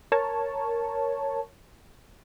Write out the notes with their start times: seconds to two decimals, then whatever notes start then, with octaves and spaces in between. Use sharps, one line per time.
0.12 A#4 C#5 A5